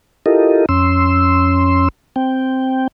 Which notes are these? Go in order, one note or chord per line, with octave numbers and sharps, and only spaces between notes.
E4 F4 G4 A4 A#4 D#5
F2 C#4 C6 E6
C4 G5